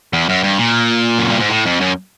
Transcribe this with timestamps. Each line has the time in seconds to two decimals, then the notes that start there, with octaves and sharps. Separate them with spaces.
0.13 E2
0.29 F#2
0.43 G2
0.59 A#2
1.19 F#2
1.29 G2
1.40 G#2
1.50 A2
1.65 F2
1.81 F#2